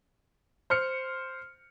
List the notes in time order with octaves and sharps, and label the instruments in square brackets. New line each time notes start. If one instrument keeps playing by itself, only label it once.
[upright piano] C5 F6 C#7